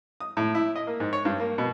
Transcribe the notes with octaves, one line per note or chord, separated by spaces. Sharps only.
D#6
A2
E4
D#5
A#3
G#2
C#5
G2
A#3
B2